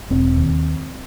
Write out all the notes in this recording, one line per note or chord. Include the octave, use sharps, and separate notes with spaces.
E1 C4
D#2